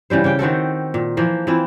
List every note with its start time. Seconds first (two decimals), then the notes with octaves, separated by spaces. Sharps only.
0.10 C#3 E3 G3 C5
0.24 C#3 G4 G5
0.39 D#3 C4 F#4 A4
0.94 A#2
1.17 E3 F3 A#3
1.47 E3 C4 E4 F4